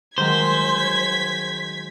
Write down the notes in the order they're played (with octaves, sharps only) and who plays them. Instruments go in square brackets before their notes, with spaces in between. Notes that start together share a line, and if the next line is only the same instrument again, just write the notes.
[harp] D#3 F#3 G#3 [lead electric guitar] C5 [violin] G#6 B6